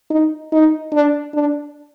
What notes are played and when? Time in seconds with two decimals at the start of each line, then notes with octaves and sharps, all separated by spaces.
0.10 D#4
0.52 D#4
0.93 D4
1.34 D4